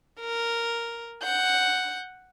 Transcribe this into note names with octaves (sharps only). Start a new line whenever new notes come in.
A#4
F#5 G6